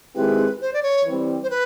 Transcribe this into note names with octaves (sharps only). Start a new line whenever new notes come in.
D#3 G#3 C4 E4 G4 B4
C5
D5
C#5
E3 G3 C4
C5
B4